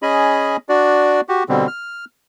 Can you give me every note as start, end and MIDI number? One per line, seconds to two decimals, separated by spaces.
0.02 0.57 61
0.02 0.57 68
0.02 0.57 75
0.02 0.57 80
0.02 0.57 83
0.69 1.21 62
0.69 1.21 66
0.69 1.21 74
1.29 1.44 66
1.29 1.44 67
1.49 1.67 47
1.49 1.67 50
1.49 1.67 55
1.49 1.67 60
1.67 2.05 89